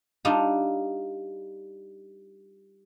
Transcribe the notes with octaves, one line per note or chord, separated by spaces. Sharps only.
G3 D4 D#4 F4